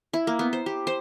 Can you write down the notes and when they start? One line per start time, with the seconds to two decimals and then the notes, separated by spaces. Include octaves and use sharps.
0.13 E4
0.27 A#3
0.39 B3
0.53 C5
0.66 G4
0.87 C5